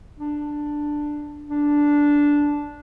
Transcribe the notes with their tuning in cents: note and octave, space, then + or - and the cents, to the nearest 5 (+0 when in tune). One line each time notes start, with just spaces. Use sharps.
D4 +10
D4 -5